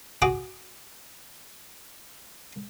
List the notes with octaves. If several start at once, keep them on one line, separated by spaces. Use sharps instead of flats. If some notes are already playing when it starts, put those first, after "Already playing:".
F#4 G#4 D6